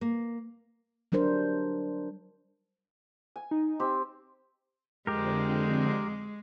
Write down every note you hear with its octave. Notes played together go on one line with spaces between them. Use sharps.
A#3
F#3 G3 D4 A#4 C5
G#5
D#4
C4 G4 E6
F2 D3 G#3 C4 G4 A#4